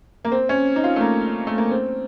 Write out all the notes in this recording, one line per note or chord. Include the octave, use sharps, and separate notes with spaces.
A#3
C4
C#4
D#4
F4
A3
A#3
A3
A#3
C4